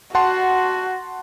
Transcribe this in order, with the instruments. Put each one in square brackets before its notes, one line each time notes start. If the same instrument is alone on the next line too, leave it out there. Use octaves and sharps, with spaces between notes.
[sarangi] F#4 [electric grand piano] F#5 A5 C6